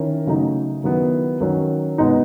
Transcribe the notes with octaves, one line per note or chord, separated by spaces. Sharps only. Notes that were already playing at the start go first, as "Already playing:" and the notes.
Already playing: D#3 C#4 E4
C#3 F#3 A3 D#4
D#3 F#3 B3 E4
D#3 F#3 C#4
B2 G#3 B3 D#4